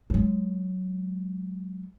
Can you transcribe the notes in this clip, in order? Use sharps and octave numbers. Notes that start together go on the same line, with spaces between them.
F#3 G#3